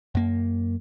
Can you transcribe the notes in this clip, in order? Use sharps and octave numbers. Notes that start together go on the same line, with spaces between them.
F#2 A#3